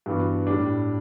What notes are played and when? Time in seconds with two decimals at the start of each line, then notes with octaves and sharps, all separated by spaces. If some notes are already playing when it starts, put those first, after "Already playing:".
0.06 G2 E3 B3 D4 F#4
0.47 A2 G3 D4